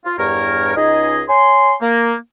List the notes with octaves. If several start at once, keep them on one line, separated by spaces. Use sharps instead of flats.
F4
E2 G2 A#4 C#5
C#2 D#4 G#4 D#5
C#5 G#5 C6
A#3